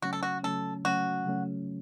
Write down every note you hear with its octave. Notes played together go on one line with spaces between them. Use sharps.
C#3 F#3 A3 C#4 F#4
A4
F#4
C#3 F#3 A3 C#4 A4
C#3 F#3 A3 C#4 F#4
C#3 F#3 A3 C#4